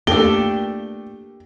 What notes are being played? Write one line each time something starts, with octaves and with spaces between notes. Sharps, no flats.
A3 A#3 D4 G4 A4 G7